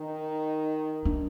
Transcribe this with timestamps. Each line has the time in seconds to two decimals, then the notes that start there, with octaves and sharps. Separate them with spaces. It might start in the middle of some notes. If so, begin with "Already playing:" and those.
Already playing: D#3 D#4
1.05 D4